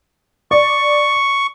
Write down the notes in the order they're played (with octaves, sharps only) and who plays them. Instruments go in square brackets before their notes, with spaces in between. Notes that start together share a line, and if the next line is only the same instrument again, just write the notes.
[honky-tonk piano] D5 [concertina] C#6